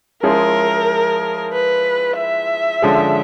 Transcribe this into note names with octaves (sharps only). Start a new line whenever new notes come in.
F3 G#3 C#4 E4 G#4 A#4
B4
E5
D3 F3 G#3 C#4